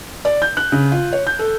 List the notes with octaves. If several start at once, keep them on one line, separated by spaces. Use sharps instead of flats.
D5
G6
F#6
C#3
F4
C#5
G6
A4